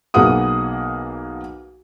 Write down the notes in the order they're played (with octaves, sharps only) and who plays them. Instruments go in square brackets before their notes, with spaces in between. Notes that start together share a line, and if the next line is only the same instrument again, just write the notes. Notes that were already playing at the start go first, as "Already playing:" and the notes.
[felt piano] B1 A#3 B3 G#4 F#5 D#6